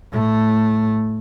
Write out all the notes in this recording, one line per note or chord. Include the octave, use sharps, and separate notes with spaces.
A2 A3